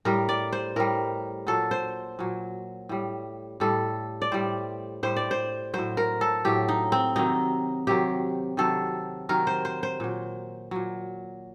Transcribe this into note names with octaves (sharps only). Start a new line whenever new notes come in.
A2 G3 A#4
D5
C5
A2 G3 A#4
A#2 F#3 A4
C5
A#2 F#3
A2 G3
A2 G3 A4
D5
A2 G3 C5
A2 G3 C5
D5
C5
A2 F#3 C5
A#4
A4
A2 F#3 G4
D#4
C4
C3 D#3 F#3 D#4
C3 D#3 F#3 G4
C3 D#3 F#3 A4
C3 D#3 F#3 A#4
C5
C5
C5
A#2 F#3
A#2 F#3